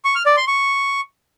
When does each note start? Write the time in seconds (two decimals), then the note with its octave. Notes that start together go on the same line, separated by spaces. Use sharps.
0.05 C#6
0.15 F6
0.26 D5
0.37 C6
0.47 C#6